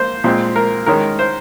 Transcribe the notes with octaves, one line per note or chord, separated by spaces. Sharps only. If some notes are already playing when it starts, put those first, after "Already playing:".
Already playing: A#3 C5
A#2 G#3 C4
A#4
D#3 G#3 C#4 A#4
C5